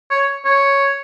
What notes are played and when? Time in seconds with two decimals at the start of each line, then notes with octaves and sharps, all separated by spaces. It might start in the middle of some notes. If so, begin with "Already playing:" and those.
0.11 C#5
0.45 C#5